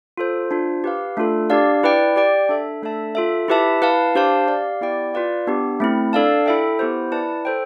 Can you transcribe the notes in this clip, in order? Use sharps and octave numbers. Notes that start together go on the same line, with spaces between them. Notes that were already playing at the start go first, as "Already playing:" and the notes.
F4 A4 C5
D4 F4 C5
G4 B4 F5
A3 D4 F4 A4
D4 G4 D5 F5
E4 B4 D5 G5
G4 D5 G5
D4 A4 E5
A3 D4 A4 E5 A5
F4 A4 E5
E4 G4 B4 E5 A5
E4 B4 F5 A5
D4 G4 C5 F5 A5
G4 D5 F5
B3 E4 G4 D5 G5
F4 B4 D5 F5
B3 D4 G4
A3 C4 E4
D4 A4 D5 F5 A5
E4 A4 E5 G5
B3 E4 G4 C5
E4 B4 D5 A5
A4 C5 G5